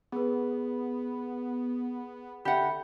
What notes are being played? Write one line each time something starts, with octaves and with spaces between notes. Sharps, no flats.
B3 G#4 B4
D3 G4 E5 F#5 B5